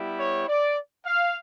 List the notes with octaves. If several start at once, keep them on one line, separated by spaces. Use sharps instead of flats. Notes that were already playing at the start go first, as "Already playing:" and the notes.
Already playing: G3 B3 E4 G4
C#5
D5
F5